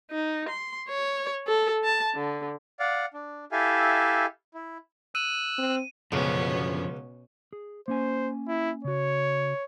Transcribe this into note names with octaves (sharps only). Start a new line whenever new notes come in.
D#4
C6
C#5
A4
A5
D3
D5 F5 F#5
D4
E4 G4 A4 E5 F5 G#5
E4
E6 F#6 D#7
C4
C#2 F#2 B2 D3 F3 B3 C#4
G#4
A#3 C#4 C5 G#5
E4
C#3 F#4 C#5